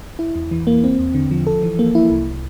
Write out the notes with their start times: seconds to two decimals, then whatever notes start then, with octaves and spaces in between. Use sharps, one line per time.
0.19 E4
0.36 E2
0.51 E3
0.67 A#3
0.84 C4
0.99 E2
1.15 D3
1.31 F3
1.47 A4
1.63 E3
1.79 A#3
1.95 E4
2.10 C2